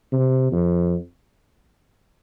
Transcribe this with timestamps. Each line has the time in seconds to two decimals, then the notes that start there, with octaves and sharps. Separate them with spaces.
0.12 C3
0.52 F2